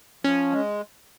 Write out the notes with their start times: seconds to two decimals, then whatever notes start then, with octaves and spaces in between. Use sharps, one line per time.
0.24 F3 C#4
0.52 G#3